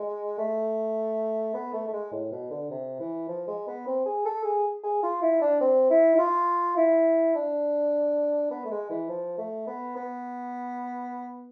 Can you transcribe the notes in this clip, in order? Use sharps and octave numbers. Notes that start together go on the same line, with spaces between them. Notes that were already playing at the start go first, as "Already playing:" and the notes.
Already playing: G#3
A3
B3
A3
A3
G#3
A2
B2
D3
C3
E3
F3
G#3
B3
C4
G#4
A4
G#4
G#4
F4
E4
D4
C4
E4
E4
F4
E4
D4
B3
A3
G#3
E3
F3
A3
B3
B3